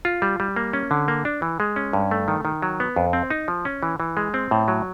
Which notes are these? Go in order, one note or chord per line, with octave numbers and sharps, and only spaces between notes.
F4
G3
G3
A#3
C#4
D3
A#3
D4
E3
G#3
C#4
G2
A3
D#3
D#3
F#3
B3
F2
C4
D#4
F3
C#4
E3
E3
G#3
C4
A2
F#3